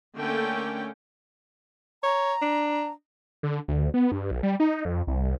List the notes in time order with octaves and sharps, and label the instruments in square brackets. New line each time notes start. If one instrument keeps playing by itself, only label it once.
[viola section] D3 A3 A#3 C#4 G5
[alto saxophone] C#5 [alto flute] A#5
[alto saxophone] D4
[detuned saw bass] D3
D2
B3
G2
B1
G3
D#4
F2
C2